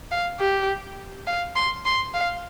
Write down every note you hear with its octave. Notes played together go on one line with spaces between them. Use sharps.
F5
G4
F5
C6
C6
F5